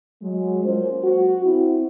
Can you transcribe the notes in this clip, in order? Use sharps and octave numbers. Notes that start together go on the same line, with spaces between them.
F#3 G#3
A#3 C#4 F4 C5
F#4
C4 E4